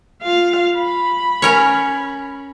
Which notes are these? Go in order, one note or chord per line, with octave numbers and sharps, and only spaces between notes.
F4 F5
B5
C#4 A#4 C#5